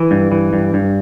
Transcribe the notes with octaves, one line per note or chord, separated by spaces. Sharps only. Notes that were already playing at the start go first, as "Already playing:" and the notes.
Already playing: E3
G2
E3
G2
G2